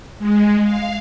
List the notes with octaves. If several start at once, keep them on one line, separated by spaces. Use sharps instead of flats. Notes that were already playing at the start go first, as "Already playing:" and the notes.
G#3
F5